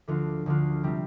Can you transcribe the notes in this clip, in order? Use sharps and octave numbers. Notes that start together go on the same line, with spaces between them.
D2 D3 F3 D4 F4
D2 D3 F3 D4 F4
C3 G3 C4 F4